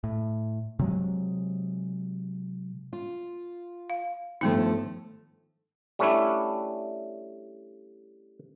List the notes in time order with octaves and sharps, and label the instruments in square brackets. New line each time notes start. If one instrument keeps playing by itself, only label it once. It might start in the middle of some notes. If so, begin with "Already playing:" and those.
[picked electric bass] A2
C3 F#3 G#3
[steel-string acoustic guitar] F4
[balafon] F5
[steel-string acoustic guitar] G2 F3 A3 [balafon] D#3 B3 D#4
[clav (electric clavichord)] G3 A3 C#4 D4 E4